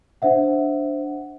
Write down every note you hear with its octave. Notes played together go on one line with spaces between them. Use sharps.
D4 C5 E5 F#5